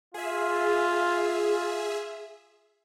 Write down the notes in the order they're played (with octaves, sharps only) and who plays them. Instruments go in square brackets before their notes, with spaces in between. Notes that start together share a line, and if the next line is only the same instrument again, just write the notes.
[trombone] F4 [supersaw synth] G#4 E5